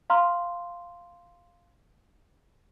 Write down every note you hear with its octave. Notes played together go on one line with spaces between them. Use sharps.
F5 A#5 C6 F6